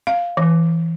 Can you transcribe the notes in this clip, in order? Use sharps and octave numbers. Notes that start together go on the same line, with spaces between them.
F5
E3